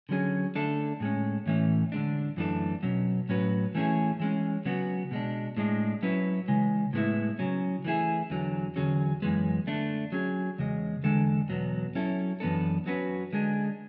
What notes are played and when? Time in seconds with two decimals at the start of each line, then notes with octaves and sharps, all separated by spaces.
0.09 D3 F#3 C#4 G#4
0.55 D3 A3 D4 A4
1.00 A2 G#3 C#4
1.46 A2 E3 A3 C#4
1.92 D3 G#3 D4
2.37 F#2 E3 A3 D4 A4
2.83 B2 F#3 C#4
3.29 A2 F#3 C#4 F#4 B4
3.75 E3 A3 C#4 E4 G#4
4.20 E3 G#3 C#4
4.65 C#3 F#3 B3 F#4
5.11 B2 G#3 D4
5.57 A2 G#3 D4
6.02 F#3 C#4 E4 B4
6.48 C#3 E3 G#3
6.93 A2 G#3 B3 E4
7.39 C#3 F#3 C#4
7.85 E3 A3 E4 G#4
8.30 E2 D3 F#3
8.76 E2 D3 F#3 C#4 G#4
9.22 F#2 E3 G#3 B3
9.67 D3 A3 D4
10.12 F#3 C#4 G#4
10.58 E2 C#3 G#3
11.03 E2 D3 G#3 D4 A4
11.49 E2 B2 F#3 B3
11.95 F#3 C#4 E4 A4
12.40 F#2 E3 B3 D4 A4
12.86 F#3 C#4 F#4 B4
13.33 D3 G#3 D4 G#4